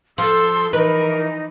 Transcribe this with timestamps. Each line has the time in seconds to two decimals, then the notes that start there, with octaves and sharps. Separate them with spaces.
0.18 F3 A4 C6 E6
0.73 E3 D#4 A#4 B4